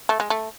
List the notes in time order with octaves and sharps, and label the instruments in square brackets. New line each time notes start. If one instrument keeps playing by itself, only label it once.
[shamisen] A3
G#3
A3